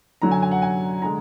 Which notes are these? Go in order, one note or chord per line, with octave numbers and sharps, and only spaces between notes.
F#2 D3 F#3 A#5
G#5
G#5
F#5
G#5
D3 G#3 A#5